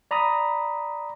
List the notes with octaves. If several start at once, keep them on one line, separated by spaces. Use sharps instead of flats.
D5 A#5 B5 D#6